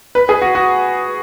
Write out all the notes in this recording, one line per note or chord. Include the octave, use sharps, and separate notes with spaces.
B4
G#4
F#4
F#4